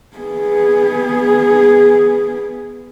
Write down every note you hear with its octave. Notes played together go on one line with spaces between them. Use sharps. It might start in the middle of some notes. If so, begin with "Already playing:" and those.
B3 G#4